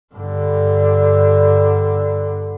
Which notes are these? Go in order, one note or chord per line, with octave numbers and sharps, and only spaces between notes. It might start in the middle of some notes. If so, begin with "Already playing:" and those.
G2 D3